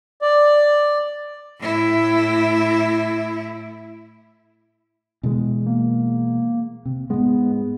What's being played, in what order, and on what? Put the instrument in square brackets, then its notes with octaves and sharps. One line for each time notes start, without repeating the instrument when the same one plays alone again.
[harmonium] D5
[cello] A2 E4
[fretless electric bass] B2 E3 G#3
[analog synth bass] A#3
[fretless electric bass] C3
[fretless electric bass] G#2 G#3 [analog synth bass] B3